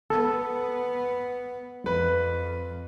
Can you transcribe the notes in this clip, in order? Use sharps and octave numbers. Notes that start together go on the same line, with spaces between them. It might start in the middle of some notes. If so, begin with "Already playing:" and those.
B3 A4
F2 B4